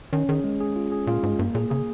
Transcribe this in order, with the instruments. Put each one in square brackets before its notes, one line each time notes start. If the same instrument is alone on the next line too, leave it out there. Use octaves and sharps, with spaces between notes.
[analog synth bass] D#3 [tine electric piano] C#4
[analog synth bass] D#3 [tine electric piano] G#4
[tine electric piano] G#3
G#4
F4
G#4
[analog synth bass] A#2 [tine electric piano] F4
[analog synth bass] G#2 [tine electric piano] G#3
[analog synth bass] G2 [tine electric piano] A#3
[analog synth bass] A#2 [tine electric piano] G#4
[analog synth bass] C#3 [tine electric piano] G#4